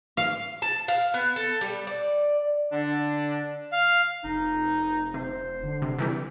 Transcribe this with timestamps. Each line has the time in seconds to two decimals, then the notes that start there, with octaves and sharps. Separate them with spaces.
0.17 F5
0.62 A5
0.88 F5
1.14 B3
1.36 A4
1.61 G3
1.87 D5
2.72 D3 D4
3.72 F5
4.24 F1 D#4
5.14 C3 C5
5.63 D3
5.82 C3
5.99 C3 E3 G3 G4